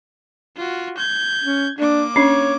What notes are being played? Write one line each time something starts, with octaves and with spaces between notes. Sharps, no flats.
F4 F#4
G6 G#6
C#4
A#3 D4 D6
C#4 D4 C#5